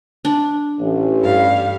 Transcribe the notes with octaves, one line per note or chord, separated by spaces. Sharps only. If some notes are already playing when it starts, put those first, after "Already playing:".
D4
A1
G2 G3 F5